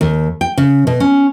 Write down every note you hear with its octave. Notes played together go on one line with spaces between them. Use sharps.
D#2
G5
C#3
B2
C#4